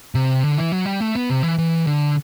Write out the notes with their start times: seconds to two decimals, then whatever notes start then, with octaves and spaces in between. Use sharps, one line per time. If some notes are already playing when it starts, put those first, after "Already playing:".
0.15 C3
0.43 D3
0.58 E3
0.72 F#3
0.85 G3
1.00 A3
1.15 B3
1.30 C3
1.43 E3
1.58 E3
1.87 D3